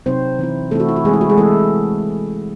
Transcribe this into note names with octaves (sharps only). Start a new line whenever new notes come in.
C3 F#3 C4 D#4 C5
E3 C4 E4
C3 E3 A3 C4 E4 A4
F#4
E4
F#4
E3 G#3 A3 C4 G#4
E4
F#4
G#3 G#4
E3 A3 C4 E4 A4